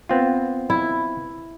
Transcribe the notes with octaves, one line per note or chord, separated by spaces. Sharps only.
B3 C4 F4
E4